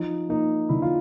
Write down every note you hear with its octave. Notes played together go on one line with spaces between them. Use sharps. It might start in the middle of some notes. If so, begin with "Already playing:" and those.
Already playing: F3 D#4
A#3 D#4
D3 E4
F4